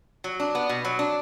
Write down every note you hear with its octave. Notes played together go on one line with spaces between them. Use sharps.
F#3
D4
B3
B2
F#3
D4